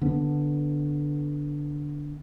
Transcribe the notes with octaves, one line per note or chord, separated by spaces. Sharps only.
D3 B3